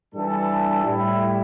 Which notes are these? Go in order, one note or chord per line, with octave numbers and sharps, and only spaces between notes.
G2 E3 G3 D4 A4
A2 G3 E4